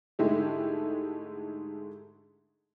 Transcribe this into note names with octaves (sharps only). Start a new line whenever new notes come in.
G#2 D3 G#3 A3 E4 G4